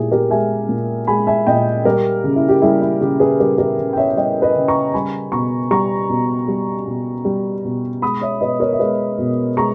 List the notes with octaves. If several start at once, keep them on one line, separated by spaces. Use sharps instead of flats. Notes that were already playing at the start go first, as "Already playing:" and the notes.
Already playing: A#2 G#3 E4 G4 G#4 G#5
G4 A#4
G#3 E5 G#5
A#2
G#3 G#5 B5
E5 G#5
A#2 D#5 G5
G3 G4 A#4
C#3
E4
G4
G3 E4 G#4
E4
C#3 G4
G#4 B4
G3 G4 A#4
G4 A#4
C#3
G5
C#5 E5
E5
G3 D#5 G5
B4 D#5
C#3
A#5 C#6
G3 G#5 B5
B2 A#5 C#6
G3 A#5 C#6
B2
G3
B2
G3
B2
G#3 B5 D#6
C#5 E5
B2 B4 D#5
A#4 C#5
E5
G#3 B4 D#5
B2
G#3 A#5 C#6